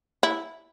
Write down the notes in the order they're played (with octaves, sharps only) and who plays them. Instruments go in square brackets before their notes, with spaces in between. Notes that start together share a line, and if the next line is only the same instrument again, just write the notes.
[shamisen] E4